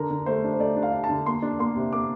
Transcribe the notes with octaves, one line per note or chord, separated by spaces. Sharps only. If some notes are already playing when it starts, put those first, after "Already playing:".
Already playing: D3 A#4
D3
A3 C5
D4
C5
A3 D5
D4
F5
D4
A5
D3
A#3 C6
D4
A#3 C6
C3
A#3 D6